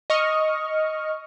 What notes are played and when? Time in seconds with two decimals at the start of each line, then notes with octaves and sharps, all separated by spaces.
0.10 D#5 C#6 F6